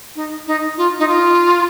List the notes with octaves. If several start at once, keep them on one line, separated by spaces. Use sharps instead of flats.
D#4
D#4
F4
D#4
F4